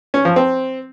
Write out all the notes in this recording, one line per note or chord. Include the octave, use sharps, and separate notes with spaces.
C#4
F3
C4